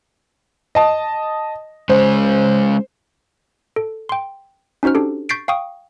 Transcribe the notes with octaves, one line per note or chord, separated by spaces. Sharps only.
D#5 A5
G#3 C#4 C5
A4
G5 C6
C#4 D#4 F#4 C5 F6
D4 G4 A4
C#6 G6 A6 B6 C7 D7
F5 G5 C#6 D#6